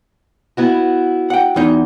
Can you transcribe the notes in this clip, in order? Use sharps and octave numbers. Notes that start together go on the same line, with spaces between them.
B3 E4 F#4
F#5 G5
E2 D#4